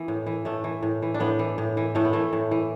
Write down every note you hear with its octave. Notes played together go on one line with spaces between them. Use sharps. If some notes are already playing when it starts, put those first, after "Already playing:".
Already playing: E3 B3
A2
E3
A2 A3
E3
A2
E3
D4
A2 B3
E3
A2
E3
A2 A3
B3
E3 A3
A2
E3